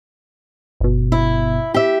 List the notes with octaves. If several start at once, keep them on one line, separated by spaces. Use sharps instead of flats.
G1 B2
E4
G4 E5